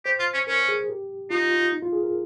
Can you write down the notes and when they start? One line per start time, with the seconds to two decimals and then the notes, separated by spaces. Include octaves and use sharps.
0.05 G4 C5
0.19 F4
0.34 C#4
0.47 C#4 A#4
0.68 G#4
0.89 G4
1.30 D#4 F4
1.51 F4
1.72 D#4
1.82 F4
1.92 G#4
2.03 A#4